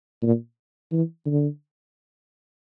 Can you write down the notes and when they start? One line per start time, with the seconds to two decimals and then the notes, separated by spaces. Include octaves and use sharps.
0.23 A#2
0.92 E3
1.26 D3